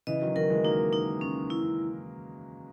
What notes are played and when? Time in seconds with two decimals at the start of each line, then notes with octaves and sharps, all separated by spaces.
0.07 C#3 E3 D#5
0.22 D#3 F#3
0.36 D#3 F#3 A#4
0.50 E3 G#3
0.64 F#3 A#3 D#4
0.93 D#4
1.21 C#4
1.50 E4